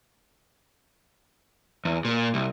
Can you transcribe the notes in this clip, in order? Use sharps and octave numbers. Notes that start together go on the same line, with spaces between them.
E2
A#2
C2